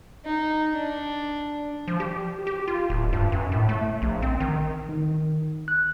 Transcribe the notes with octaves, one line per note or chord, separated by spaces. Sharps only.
D#4
D4
F3
G4
G4
F4
D1
G2
F#2
A2
A3
A#1
C4
D#3
D#3
F#6